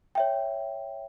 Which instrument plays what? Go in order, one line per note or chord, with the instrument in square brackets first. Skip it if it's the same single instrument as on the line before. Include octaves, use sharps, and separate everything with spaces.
[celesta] C#5 E5 G5